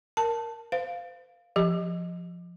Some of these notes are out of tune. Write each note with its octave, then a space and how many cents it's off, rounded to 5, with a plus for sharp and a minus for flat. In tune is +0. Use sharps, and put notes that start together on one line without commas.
A#4 +0 A5 +5
C5 -40 F5 +0
F3 +0 G4 +0